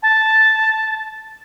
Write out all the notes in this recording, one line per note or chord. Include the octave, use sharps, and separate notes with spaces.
A5